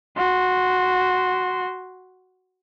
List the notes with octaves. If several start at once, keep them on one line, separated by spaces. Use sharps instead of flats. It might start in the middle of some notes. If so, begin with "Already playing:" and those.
F#4 C6